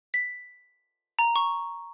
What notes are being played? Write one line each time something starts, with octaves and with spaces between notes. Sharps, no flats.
B6
A#5
C#6